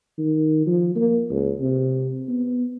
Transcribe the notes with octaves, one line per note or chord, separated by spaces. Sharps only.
D#3
F3
A#3
C#2
C3
B3